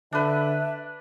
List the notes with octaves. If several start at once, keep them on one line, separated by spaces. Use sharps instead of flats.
D3 D4 B4 E5